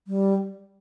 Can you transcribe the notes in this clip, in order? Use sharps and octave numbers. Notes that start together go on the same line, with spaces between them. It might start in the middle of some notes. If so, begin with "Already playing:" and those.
G3